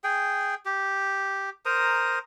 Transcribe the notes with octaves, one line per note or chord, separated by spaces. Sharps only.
G#4 G5
G4
A#4 C5 A#5 D#6